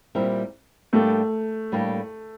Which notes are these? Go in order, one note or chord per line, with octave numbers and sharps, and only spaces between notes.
A#2 G3 C4 E4 A#4
A2 G3 A3 A#3 D4 G4
A2 G3 A#3 D4 G4